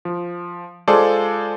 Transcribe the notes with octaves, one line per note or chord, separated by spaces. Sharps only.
F3
G#3 F4 G#4 A4 C5 D5